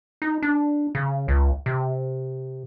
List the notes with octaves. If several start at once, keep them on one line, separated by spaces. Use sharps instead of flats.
D#4
D4
C#3
C#2
C3